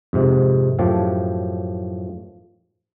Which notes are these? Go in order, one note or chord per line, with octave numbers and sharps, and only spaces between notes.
F2 G#2 C3
F#2 A2 F3 G4 A5